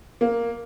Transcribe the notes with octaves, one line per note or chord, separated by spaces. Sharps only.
A#3